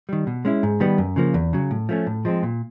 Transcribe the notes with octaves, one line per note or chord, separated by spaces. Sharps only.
D#3 G3
B2
G#3 C#4 E4
G#2
D#3 G3 B3
F#2
C#3 F3 A#3
E2
C#3 F#3
A2
F3 A3 C#4
A2
F3 G#3 C4
A#2